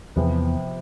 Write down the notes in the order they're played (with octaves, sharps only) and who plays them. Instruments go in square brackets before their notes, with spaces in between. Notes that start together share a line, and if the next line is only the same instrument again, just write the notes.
[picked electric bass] E2 [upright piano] C3 F3 B3